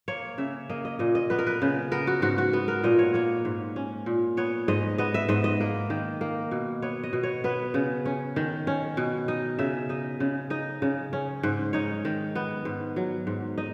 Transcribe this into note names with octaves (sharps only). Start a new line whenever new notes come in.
A#3 C#5
C#3 E5
A#3 D#5
D#5
A#2 D#5
D#5
B3 B4
A#4
B4
C#3
B3 A#4
F#4
G#2 F#4
F#4
B3
A#4
A#2 D#5
C#5
A#3 C#5
G#2
C#4
A#2
B3 C#5
G#2 D#5
B3 D#5
E5
G#2 D#5
D#5
A#3
D#3
A#3
B2
B3 C#5
D#5
B2
C#5
B3 B4
C#3
C#4
D#3
C#4
B2
D#4 D#5
C#3 E5
D#4 D#5
C#3
D#4 D#5
C#3
C#4
G#2
D#4 C#5
D#3
B3
G#2
F#3
G#2
D#4 D#5